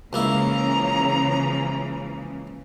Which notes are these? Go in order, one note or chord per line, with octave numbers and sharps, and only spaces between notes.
C#2 C#3 E3 F3 A#3 E4 A#5